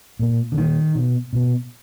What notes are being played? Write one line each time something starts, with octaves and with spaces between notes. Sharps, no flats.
A#2
D3
A#2 D#3
B2
B2